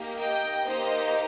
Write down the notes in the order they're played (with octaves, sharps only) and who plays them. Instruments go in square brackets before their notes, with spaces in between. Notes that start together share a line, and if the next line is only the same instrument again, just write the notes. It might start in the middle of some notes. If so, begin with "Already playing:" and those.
Already playing: [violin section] A#3 D#4 G4
D#5 G5
A#3 D#4 G4 C5 D#5